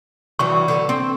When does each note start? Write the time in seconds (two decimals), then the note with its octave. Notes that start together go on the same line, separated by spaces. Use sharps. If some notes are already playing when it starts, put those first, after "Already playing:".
0.39 E3 F#3 G3 C#6
0.68 D3
0.89 C4